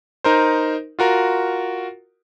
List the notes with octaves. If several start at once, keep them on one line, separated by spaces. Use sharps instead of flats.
D#4 A#4 C5
F4 F#4 A#4